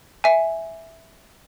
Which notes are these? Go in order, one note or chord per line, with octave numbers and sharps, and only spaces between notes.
E5 G#5